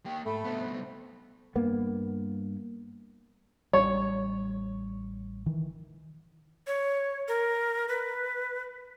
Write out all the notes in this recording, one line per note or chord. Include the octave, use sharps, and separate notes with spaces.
A#3 G4 G5
G#2 A3 B5
C2 B3 C5
G2 A#3 B3
A1 G3 C#5
D#3 E3
C#5
A#4
B4